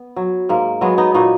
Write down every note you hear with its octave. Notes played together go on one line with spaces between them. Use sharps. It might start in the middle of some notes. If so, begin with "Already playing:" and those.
Already playing: B3
F#3
G#2 A#3
F#3 G#3 B3
B3 D#4
A#2 D#4 F#4